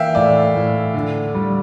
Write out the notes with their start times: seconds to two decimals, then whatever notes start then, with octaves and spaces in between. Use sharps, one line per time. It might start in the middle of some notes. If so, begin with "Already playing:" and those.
Already playing: E3 A#3 E5 F5 G5
0.15 A2 D5
0.55 A2
0.94 D3
1.35 G3